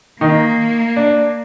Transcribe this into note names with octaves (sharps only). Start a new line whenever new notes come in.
D#3 A#3 D#4
D4